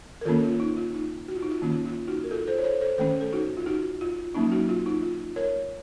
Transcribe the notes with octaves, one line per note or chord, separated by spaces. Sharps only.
A#4
D#3 A#3 C#4 F4 A4
F4
D#4
F4
D#4
F#4
F4
D#4
F4
D#3 A#3 C#4 F4
F4
D#4 F#4
A#4
F4 A4
A4 C5
C#5
A4 C5
A4 C5
D#3 A3 C#4 A4 C5
A4
D#4 F#4
F4
D#4 F#4
F4
F#3 A#3 C#4 D#4
D#4 F#4
F4
D#4
F4
A#4 C#5